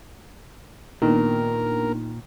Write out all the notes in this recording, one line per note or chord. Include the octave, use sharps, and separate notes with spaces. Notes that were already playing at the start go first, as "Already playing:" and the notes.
A#2 D#3 A#3 B3 D4 A#4